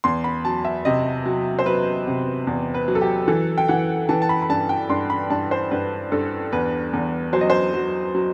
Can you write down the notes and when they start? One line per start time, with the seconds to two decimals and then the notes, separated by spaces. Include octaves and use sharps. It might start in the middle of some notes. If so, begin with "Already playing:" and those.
0.04 E2 C6
0.24 B5
0.45 F#3 A5
0.65 E5
0.85 C3 D#5
1.26 F#3
1.59 C5
1.66 F#3 B4
2.07 C3
2.47 E2
2.74 B4
2.88 F#3
2.95 A4
3.01 G4
3.28 E3 A4
3.58 G5
3.68 E3 F#5
4.09 E3 A5
4.22 A5
4.29 B5
4.42 B5
4.49 G2 A5
4.69 G5
4.90 G2 C6
5.10 B5
5.30 G2 A5
5.51 C5
5.71 G2 B4
6.12 G2 A4
6.52 E2 B4
6.93 E2
7.33 F#3 C5
7.41 D#5
7.50 C5
7.74 F#3
8.15 F#3